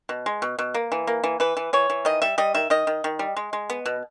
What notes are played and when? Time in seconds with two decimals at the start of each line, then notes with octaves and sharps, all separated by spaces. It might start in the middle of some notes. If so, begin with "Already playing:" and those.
0.09 B2
0.26 G#3
0.42 B2
0.59 B2
0.74 A#3
0.92 E3
1.07 A#3
1.24 E3
1.40 E3 B4
1.57 E3
1.73 E3 C#5
1.90 E3
2.05 D#3 D#5
2.22 G3 E5
2.38 G3 D#5
2.54 D#3 E5
2.70 D#3 D#5
2.87 D#3
3.04 D#3
3.19 G3
3.37 G#3
3.53 G#3
3.70 B3
3.86 B2